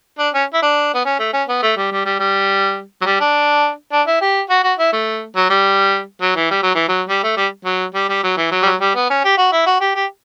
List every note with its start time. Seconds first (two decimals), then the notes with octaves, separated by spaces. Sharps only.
0.19 D4
0.34 C#4
0.53 E4
0.62 D4
0.94 B3
1.05 C#4
1.19 A3
1.33 C#4
1.48 B3
1.62 A3
1.77 G3
1.92 G3
2.05 G3
2.20 G3
3.02 F#3
3.06 G3
3.20 D4
3.92 D4
4.07 E4
4.21 G4
4.50 F#4
4.64 F#4
4.79 E4
4.93 A3
5.36 F#3
5.50 G3
6.21 F#3
6.36 E3
6.51 G3
6.63 F#3
6.75 E3
6.88 F#3
7.09 G3
7.23 A3
7.37 G3
7.65 F#3
7.94 G3
8.09 G3
8.23 F#3
8.37 E3
8.51 F#3
8.62 G3
8.65 F#3
8.81 G3
8.95 B3
9.10 C#4
9.24 G4
9.37 F#4
9.52 E4
9.66 F#4
9.80 G4
9.95 G4